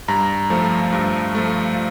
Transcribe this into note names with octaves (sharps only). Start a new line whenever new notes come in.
G2 A#5
F3 A3
G2
F3 A3